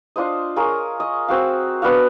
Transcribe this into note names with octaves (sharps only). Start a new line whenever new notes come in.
D4 F4 C5 D#5
F4 G#4 A#4 C#5
D#5
C4 F#4 F5
B3 D4 F#4 F5